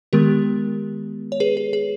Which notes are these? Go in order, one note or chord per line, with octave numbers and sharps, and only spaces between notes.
D#3 G#3 B3 G4 A#4
C#5
G#4 B4
G#4
G#4